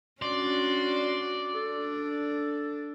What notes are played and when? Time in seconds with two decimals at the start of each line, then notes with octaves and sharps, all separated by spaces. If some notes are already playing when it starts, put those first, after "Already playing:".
0.22 C#4 D4 F#4 D5 C6
1.54 D4 A4